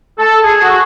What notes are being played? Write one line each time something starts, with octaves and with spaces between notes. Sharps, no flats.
A4
G#4
F#4